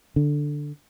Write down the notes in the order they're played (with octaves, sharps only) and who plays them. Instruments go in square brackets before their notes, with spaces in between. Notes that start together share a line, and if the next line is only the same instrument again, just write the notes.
[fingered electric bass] D3